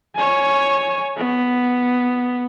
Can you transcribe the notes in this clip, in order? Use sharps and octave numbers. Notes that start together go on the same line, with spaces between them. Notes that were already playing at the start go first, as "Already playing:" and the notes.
C#5 G#5
B3